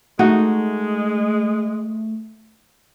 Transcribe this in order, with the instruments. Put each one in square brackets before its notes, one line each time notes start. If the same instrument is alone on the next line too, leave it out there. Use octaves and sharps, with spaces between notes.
[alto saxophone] G#3 [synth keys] A3 [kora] D#4 F#4